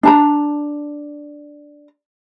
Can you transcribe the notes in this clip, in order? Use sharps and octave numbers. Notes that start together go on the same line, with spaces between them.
D4 A5 A#5